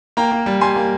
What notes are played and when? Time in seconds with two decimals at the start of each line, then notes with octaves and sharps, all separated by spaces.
0.17 A#3 G5 A#5
0.32 A#3
0.46 G3
0.61 G3 G#5 C6
0.76 A#3